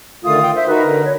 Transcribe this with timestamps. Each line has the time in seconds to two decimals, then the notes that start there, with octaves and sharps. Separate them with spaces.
0.25 D3 D#3 A3 F4 D#6
0.43 G5
0.56 C5 E5
0.67 D#4 F#4 A#4 B4
0.82 D3
1.03 C#5